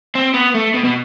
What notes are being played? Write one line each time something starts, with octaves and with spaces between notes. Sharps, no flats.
C4
B3
A3
B2
B2